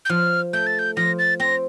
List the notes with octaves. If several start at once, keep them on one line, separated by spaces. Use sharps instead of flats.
G6
F3 F6
A3 G6
A6
G6
F3 A#6
A6
C4 A#6